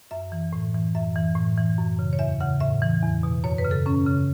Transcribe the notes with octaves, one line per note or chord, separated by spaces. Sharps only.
F#2 E5
E3
A2
E3
F#2 E5
E3
A2
E3
F#2
C#3
C#5
E2 E5
C#3 F#5
A2 E5
E3
E2
B2
F#2 C#5
B4
C#3
A4
F#2 C#4
C#3